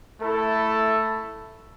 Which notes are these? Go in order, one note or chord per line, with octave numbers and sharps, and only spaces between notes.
A3 E4 A4